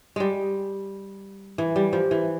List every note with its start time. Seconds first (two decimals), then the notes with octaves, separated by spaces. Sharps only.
0.16 G3 G#3
1.58 E3
1.76 G3
1.93 F3
2.11 E3